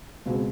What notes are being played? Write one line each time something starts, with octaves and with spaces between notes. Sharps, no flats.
C#2 B2 G#3 C4 F#4 G#4